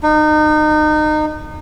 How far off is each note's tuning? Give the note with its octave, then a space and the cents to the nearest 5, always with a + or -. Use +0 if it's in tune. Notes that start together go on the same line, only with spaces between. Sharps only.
D#4 -30